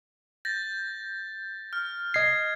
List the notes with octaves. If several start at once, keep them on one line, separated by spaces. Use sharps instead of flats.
G6 A6 A#6
F6
D#5 G#6 C7